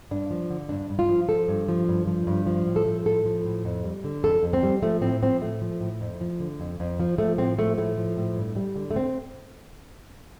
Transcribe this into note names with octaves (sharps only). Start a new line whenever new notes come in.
G2 D4
F3
D3
G2 D4
G2
F4
F3
F3 A4
G2
F3
G2
F3
G2
F3
A2
A4
F3
A2 A4
F3
A2
F2
G3
D3
F2 A4
F2
C4
G3
F3 A3
A2 C4
F3 C4
A2 A3
F3
A2
F2
F3
D3
F2
F2
F3
F3 A3
A2 C4
F3 A3
A2 A3
F3
A2
G2
G3
D3
A3
C4